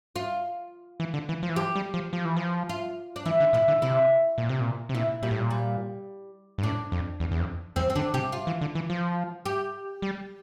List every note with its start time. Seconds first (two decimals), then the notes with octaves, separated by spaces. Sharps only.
0.16 F4
1.00 E3
1.14 D3
1.29 E3
1.43 F3
1.50 E3
1.56 F3 G4
1.76 G3
1.94 F3
2.13 F3
2.25 E3
2.37 F3
2.69 F4
3.16 D4
3.26 E3 E4
3.40 D3
3.53 A#2 E4
3.68 D3
3.82 C3 E4
4.38 A#2
4.49 C3
4.61 A#2
4.89 C3
4.95 A#2 E4
5.23 A#2 G3
5.31 A2
5.40 A#2
5.50 G3
6.58 G2
6.63 A2 D4
6.92 F2
7.20 E2
7.31 E2
7.39 F2
7.76 E2 C4
7.90 C4
7.96 D3 D4
8.14 C3 G4
8.32 F4
8.47 E3
8.61 D3
8.75 E3
8.90 F3
9.46 G4
10.02 G3